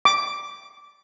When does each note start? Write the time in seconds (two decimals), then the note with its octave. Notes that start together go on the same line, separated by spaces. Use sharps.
0.05 D6